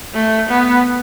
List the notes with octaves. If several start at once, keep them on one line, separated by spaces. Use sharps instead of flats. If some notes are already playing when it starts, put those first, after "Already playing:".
A3
B3